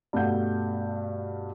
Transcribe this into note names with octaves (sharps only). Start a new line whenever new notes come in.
G2 B2 A3 F5 F#5 G6